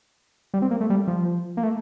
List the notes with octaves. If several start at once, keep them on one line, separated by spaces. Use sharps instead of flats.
G3
C4
A#3
A3
G3
F3
A#3
A3